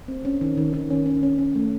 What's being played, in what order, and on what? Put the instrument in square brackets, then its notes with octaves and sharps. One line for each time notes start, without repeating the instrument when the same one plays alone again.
[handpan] C4
C#4
D#3
D#3
D#3
C#4
C#4
C#4
C#4
A3